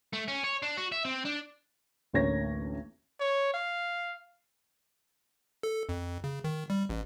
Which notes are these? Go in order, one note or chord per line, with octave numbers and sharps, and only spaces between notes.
A3
C#4
C#5
D4
F#4
E5
C4
D4
A1 D2 A#3 C#5 G#6 A#6
C#5
F5
A4
F2
C#3
D#3
G3
A1